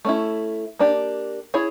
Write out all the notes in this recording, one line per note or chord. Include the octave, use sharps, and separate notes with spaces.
A3 C#4 E4
A#3 D4 G4
E4 G#4 C#5